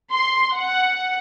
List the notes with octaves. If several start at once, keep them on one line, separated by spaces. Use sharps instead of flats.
C6
F#5